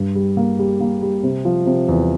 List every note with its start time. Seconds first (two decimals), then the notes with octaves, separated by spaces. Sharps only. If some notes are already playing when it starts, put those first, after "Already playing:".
Already playing: G2
0.15 G3
0.37 A#3
0.59 G3
0.80 A#3
1.02 G3
1.23 C3
1.45 F3
1.66 C3
1.89 E2